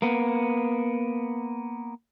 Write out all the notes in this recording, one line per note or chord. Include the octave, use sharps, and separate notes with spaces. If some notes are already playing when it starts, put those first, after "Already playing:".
A#3 B3